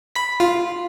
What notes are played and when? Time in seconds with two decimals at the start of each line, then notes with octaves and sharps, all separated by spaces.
0.15 B5 B6
0.40 F4